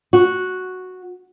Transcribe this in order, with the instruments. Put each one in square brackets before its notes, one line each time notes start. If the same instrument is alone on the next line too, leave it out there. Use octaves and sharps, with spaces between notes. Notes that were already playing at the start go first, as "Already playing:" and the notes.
[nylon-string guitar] F#4